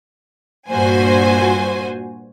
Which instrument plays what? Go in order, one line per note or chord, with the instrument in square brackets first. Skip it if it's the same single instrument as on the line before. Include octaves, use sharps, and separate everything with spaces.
[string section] G2 A#2 F#4 C5 G#5